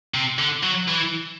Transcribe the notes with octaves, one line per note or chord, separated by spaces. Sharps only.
C3
D3
F#3
E3